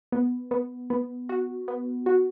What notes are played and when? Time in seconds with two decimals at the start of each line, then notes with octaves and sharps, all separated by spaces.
0.12 B3
0.51 B3
0.90 B3
1.29 F#4
1.68 B3
2.06 F#4